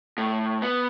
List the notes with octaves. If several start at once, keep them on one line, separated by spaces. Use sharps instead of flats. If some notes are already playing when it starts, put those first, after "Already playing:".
A2
B3